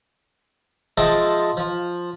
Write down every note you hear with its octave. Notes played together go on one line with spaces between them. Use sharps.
F3 G#3 D#5 E5 G5 A5
F3